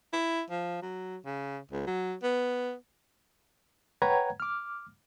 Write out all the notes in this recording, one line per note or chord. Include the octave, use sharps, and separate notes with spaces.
E4
F3
F#3
C#3
C#2
F#3
B3
B4 C#5 F#5 G5 A#5 G#6
D6 F6